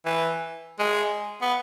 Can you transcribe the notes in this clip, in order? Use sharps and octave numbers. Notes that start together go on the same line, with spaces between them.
E3
G#3
B3